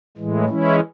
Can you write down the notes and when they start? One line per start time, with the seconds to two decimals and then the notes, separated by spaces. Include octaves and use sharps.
0.17 A2 E3 G#3
0.49 E3 G#3 C#4 E4